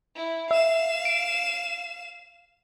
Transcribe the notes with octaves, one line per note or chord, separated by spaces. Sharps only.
E4
E5 F5 E7
D7